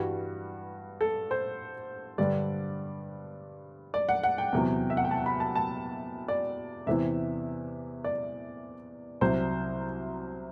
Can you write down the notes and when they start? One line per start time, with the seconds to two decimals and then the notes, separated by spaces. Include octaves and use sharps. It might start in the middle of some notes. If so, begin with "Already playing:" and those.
Already playing: G2 E3 G3 F#4
1.01 A4
1.31 C5
2.18 G2 D3 G3 D5
3.94 D5
4.09 F#5
4.23 F#5
4.38 G5
4.53 E2 C3 F#3
4.90 E5
4.97 F#5
5.05 G5
5.11 A5
5.26 B5
5.40 A5
5.55 A5
6.28 D5
6.87 E2 C3 E3 E5
8.04 D5
9.21 C2 C3 F#3 C5